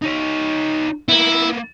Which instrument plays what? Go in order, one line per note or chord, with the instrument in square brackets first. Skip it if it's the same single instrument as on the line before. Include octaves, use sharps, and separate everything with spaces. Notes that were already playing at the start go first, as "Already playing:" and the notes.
[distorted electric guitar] D#4 C#5
[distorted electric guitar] A#3 B3 [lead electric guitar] E4